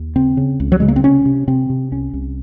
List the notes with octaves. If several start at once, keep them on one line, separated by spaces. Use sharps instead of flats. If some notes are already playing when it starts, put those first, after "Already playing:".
Already playing: D#2
C#3 C4
C#3
C#2
F#3
C#3 G#3
A#3
C4
C3 C#4
C3
C3 C4
C3
C2 C#4
C2